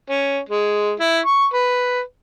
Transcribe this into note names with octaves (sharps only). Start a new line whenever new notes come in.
C#4
G#3
E4
C#6
B4